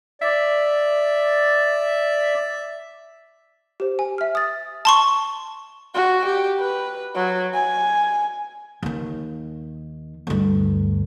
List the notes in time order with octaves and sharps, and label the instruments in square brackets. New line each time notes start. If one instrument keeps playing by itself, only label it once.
[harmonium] D5 [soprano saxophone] E5
[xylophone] G4 C5
G#5
E5 F6
D#6 A6
A5 C6 C#6
[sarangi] F#4
G4
B4
F#3
G#5
[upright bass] D#2 D#3
D2 G2